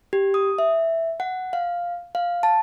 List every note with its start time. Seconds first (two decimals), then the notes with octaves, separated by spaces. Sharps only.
0.13 G4
0.34 D#6
0.59 E5
1.20 F#5
1.53 F5
2.15 F5
2.43 A5